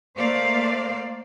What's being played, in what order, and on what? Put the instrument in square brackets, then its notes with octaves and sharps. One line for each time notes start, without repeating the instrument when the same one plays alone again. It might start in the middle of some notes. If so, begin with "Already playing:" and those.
[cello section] A3 A#3 C5 D5 F5